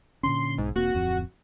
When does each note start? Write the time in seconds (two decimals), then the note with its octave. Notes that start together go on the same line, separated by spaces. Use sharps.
0.23 A#2 D3 C#4 C6
0.58 B1 G#2
0.76 E1 A#3 C4 F#4
0.95 D1 F2 C4